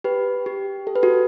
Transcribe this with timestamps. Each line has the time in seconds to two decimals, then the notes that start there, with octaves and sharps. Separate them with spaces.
0.04 G4 B4
0.46 G4
0.87 A4
0.96 B4
1.03 F#4 A4